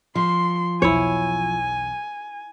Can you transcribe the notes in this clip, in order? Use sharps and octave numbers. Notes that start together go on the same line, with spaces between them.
F3 C6
B1 E2 E4 C#5 G#5